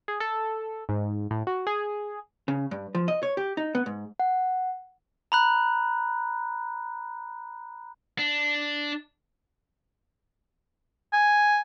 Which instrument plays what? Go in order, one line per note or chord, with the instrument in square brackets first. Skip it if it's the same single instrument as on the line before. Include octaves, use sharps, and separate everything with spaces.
[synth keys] G#4
A4
G#2
A2
F#4
G#4
[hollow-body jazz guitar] C#3
G2
F3
D#5
C#5
G4
D#4
B3
G#2
[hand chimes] F#5
[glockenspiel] A#5 B5 F#6
[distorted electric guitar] D4
[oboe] G#5